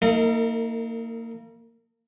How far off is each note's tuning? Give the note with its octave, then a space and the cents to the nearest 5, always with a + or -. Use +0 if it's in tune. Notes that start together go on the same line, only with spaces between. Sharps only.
A#3 -25 D#4 +35 A#4 -45